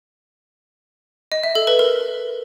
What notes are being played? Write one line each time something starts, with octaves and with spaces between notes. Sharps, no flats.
D#5
E5
A4
B4
A#4